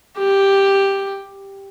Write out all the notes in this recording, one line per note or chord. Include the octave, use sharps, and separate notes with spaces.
G4